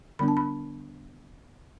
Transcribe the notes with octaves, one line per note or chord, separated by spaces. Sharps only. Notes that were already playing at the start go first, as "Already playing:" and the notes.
D3 G3 B3 D4 B5
A5
B5